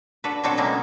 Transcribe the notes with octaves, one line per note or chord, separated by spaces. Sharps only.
D4 F#4 A4 B4
B2 F#3 C4 D4 F#4 A4
C#3 F#3 G#3 A#3 B3